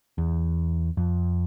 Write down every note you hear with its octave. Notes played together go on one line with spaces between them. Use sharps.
E2
F2